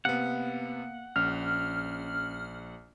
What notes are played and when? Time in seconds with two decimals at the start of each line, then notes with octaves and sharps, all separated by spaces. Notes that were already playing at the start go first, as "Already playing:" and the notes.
0.05 C3 A#3 B3 F5 F#5
1.16 A#1 C#4 F6